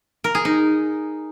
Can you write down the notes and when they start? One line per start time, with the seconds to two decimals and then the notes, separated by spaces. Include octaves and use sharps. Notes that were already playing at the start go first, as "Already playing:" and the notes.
0.24 A#4
0.35 G#4
0.45 D#4